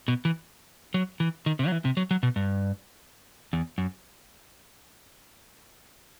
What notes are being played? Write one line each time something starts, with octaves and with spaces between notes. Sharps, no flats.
B2
E3
F#3
E3
D#3
C3
F#3
E3
C3
F#3
F#3
B2
G2
E2
F#2